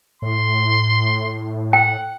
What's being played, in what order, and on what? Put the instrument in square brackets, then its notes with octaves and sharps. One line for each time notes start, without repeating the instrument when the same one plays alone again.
[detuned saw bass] A2 [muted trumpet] C6
[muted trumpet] F#5 [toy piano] G5